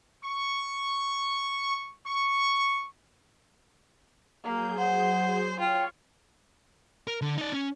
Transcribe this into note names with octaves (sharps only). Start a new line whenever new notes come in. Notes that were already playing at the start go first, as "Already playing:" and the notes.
C#6
C#6
F#3 A#3 G#4 G6
C5 F#5
F4 C#5 G5
A#4
D3
D#4 D5
C#4